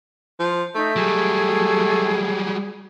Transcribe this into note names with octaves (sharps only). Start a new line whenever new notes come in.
F3
A3 D#4 E5 G6
F#3 G3 G#4